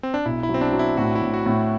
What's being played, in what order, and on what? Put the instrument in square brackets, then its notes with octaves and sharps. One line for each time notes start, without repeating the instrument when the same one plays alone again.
[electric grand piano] C4
D4
[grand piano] B1 [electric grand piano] E4
[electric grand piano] E4
[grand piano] F#3
[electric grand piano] C4
D4
[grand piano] F#3
[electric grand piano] E4
[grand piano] A2 [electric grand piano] F#4
[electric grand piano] E4
[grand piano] A2
[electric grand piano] F#4
[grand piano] A2